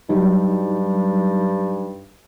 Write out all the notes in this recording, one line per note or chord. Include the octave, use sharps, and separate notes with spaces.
G2 F#3 G3 D#4